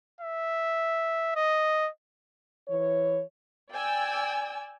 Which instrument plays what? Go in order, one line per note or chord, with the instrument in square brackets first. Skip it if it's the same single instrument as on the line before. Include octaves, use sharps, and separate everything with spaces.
[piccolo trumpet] E5
D#5
[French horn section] E3 C#5
[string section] D5 G5 G#5 E6